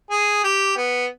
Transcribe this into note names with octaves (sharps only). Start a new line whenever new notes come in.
G#4
G4
B3